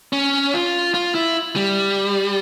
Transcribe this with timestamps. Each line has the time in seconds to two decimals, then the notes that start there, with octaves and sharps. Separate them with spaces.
0.13 C#4
0.54 F4
0.94 F4
1.15 E4
1.56 G3